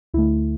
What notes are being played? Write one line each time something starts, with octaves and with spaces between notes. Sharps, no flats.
D2 D3 A3 E4